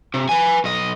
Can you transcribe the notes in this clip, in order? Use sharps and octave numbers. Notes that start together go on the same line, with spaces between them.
C3
B4 G#5
B1 D#5